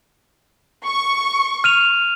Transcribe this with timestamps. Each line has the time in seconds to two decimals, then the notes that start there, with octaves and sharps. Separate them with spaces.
0.86 C#6
1.64 F6 D#7 F7